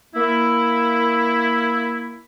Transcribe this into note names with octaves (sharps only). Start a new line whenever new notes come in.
A#3 E4